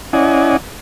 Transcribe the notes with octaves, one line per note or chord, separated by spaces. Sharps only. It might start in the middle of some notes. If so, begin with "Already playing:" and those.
C#4 E4 D5 D#5 F#5 G#5